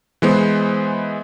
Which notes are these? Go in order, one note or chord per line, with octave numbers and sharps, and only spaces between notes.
E3 G#3 B3 C5